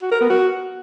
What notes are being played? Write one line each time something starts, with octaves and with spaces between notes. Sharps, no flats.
F#4
A#4
B3
F#4